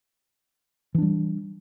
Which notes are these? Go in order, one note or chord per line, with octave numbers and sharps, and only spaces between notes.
E3 G3 D4